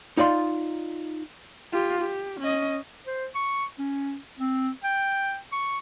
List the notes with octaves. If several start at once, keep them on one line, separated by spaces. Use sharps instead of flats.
D#4 F4 D5 C6
F4 G4
G4
C#4 D#5
C5
C#6
C#4
C4
G5
C#6